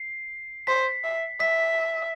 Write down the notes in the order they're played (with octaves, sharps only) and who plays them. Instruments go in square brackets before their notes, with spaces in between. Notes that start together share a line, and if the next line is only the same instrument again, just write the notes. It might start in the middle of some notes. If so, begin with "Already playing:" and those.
Already playing: [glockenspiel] C7
[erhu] C5 [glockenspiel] B6
[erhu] E5
[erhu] E5 [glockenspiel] B6